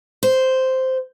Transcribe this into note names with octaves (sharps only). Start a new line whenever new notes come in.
C5